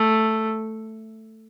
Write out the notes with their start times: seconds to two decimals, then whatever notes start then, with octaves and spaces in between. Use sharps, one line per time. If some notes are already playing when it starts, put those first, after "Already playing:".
Already playing: A3